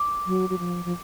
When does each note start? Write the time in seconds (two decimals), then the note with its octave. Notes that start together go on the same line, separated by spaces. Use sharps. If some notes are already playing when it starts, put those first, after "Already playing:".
Already playing: D6
0.26 F#3
0.49 F#3
0.59 F3
0.85 F3